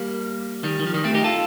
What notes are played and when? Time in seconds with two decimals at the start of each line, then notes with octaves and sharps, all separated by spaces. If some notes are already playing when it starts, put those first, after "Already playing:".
Already playing: G3 A#3
0.63 D#3 G3
0.80 D#3
0.86 F3
0.94 D#3 G3
1.04 A3 C4
1.14 D#4 G4
1.24 F4 A4